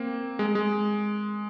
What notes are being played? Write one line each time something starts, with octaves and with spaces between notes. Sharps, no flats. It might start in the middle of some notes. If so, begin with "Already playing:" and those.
Already playing: A#3 C4
G#3
G#3